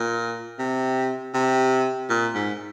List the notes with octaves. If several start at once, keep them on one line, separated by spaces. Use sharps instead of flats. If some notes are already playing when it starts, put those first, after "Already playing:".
Already playing: A#2
C3
C3
A#2
G#2